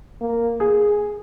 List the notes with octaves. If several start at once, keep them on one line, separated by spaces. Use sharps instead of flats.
A#3
G#4